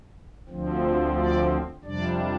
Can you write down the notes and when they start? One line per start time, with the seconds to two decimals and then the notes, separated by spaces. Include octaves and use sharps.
0.49 D2 D3 F3 C4
1.17 D5
1.84 F2 C3 G3 D4 D5